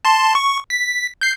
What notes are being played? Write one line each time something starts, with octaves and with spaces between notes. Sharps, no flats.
A5 C6
C#6
B6
G6 C7